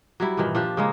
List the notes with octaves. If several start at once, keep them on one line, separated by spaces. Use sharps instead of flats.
F#3 G3 E4
G2 A#2 D#3 E3
F3 D4 G4
C#3 G#3 A#3